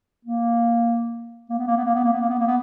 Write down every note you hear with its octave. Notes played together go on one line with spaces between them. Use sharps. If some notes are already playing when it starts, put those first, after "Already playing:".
A#3
A#3
B3
A#3
B3
A#3
B3
A#3
B3
A#3
B3
A#3
B3